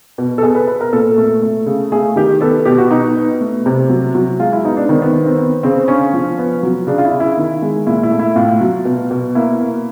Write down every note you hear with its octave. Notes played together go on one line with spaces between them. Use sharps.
B2
A4
B3 G#4
B4
B3 B4
A#4
A#2 A4
A3
A3
C#3
A3 G#4
D#3 G4
B3 A4
B2 G4
F#4
B2 D#4
B3
A3
C3
F#3
F#3
G#3 F4
E4
B3 D#4
D4
D#3 C4
B3
B3
C4
B3
C#3 C4
D3 C#4
F3
B3
F#3
C#3 D4
F4
E4
C#3
E4
D#3
G#3
A#2 E4
E4
A3
E4
A2 F4
F#3
B2
B2
A#3 E4
A#3